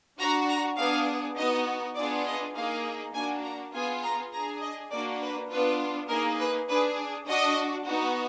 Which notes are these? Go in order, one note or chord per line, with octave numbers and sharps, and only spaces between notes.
D4 F#4 A#5
A#5
B3 D4 G#4 F5
B3 D#4 F#4 D#5
B3 D4 F4 G#4 D5
D#5
A#3 D#4 G#4 F5
A#3 D4 F#4 G#5
A#5
B3 F4 G#4 G#5
A#5
D4 G#4 A#5
D#5
A#3 D4 F#4 D5
B4
B3 D4 F4 B4
A#3 D#4 G#4 A#4
B4
D4 G#4 B4
D4 F#4 D#5
B3 D#4 F#4